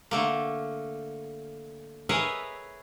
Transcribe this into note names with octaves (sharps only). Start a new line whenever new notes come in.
D3 A3 A#3
G#4 A#4 B4 C#5 D#5 E5